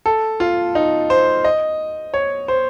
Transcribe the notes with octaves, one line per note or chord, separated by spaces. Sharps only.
A4
F4
D#4
C5
D#5
C#5
C5